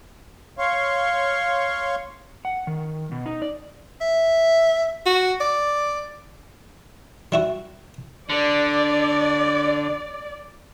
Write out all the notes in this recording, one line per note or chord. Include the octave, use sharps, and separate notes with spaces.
C#5 F5 C6 C#6
F#5
D#3
B2
D#4
D5
E5
F#4
D5
G3 E4 F#4
D3 D5